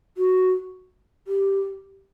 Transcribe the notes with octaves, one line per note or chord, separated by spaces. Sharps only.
F#4
G4